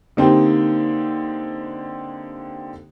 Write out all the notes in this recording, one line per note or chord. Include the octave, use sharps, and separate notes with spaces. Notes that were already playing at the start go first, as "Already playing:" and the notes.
D3 A#3 C4 D#4 G4 C5